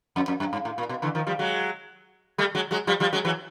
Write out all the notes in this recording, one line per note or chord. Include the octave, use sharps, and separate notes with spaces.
F2
F2
F#2
G2
A2
A#2
B2
D3 E3
D#3 F3
F3 G3
F#3 G#3
G3 A3
F#3 G#3
F#3 G#3
F3 G3
F3 G3
F#3 G#3
E3 F#3